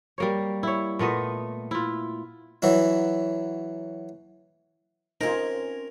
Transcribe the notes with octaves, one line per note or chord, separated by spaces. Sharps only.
G3 A#3 C#5
E4 C#5
A#2 A3 B3 D#5
E4 F4
E3 F#3 E4
C4 C#4 D#4 F4 A#4